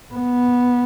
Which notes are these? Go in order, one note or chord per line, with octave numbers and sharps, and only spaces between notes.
B3